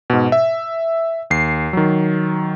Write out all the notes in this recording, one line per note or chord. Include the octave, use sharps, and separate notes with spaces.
G#2 B2
E5
D#2 C7
D#3 F#3